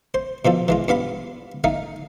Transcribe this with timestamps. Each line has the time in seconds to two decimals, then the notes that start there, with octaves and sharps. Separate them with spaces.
0.14 C5
0.45 B2 F3 F4 A4
0.68 E3 G#3 F4
0.88 G2 B3 F5 B5
1.64 A3 D#4 F5